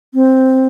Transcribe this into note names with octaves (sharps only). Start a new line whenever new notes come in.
C4